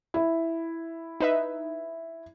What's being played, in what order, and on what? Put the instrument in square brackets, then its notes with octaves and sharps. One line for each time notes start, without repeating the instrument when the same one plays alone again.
[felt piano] E4
[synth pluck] D#4 B4 E5